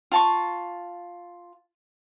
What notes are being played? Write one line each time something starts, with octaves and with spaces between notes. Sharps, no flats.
F4 A5 C#6